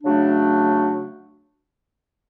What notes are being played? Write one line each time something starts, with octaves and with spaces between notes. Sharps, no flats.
C#3 F#3 A3 D4